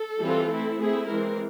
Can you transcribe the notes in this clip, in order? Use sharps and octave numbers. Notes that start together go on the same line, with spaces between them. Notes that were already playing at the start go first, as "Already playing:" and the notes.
Already playing: A4
E3 G3 C4 F4
A3 C4 E4
A3 C4 E4 G#4
E3 G#3 C4 A#4